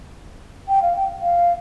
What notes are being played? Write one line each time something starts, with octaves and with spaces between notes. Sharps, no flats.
G5
F5
G5
F5